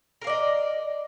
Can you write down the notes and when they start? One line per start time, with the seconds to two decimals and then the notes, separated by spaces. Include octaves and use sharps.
0.22 A#4
0.24 F5
0.27 D5
0.30 D#5